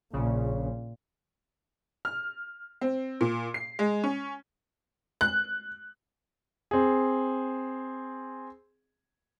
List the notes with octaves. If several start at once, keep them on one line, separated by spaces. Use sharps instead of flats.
A#1 A#2 C#3
F6
C4
A#2
C7
G#3
C#4
F#6
C4 G#4